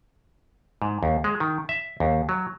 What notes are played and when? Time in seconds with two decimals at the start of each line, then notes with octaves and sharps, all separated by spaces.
0.82 G#2
1.03 D#2
1.24 G#3
1.40 D#3
1.69 E5
2.00 D#2
2.29 F#3